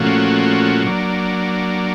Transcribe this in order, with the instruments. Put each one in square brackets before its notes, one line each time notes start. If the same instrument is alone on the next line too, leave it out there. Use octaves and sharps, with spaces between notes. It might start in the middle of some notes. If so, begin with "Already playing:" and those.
Already playing: [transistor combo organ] A#2 F3 A3 C#4 F#4
F#3 A#3 D4